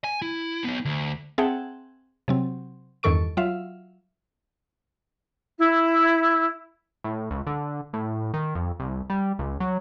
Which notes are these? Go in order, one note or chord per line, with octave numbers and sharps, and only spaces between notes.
G#5
E4
B3 D#4
D2
C4 G#4 E5 F#5 G5 A5
C3 F#3 C4
E2 G2 D#3 A4 C#6 D7
F#3 F4 E5 F5
E4
A2
C#2
D3
A2
D#3
F2
C2
G3
C#2
F#3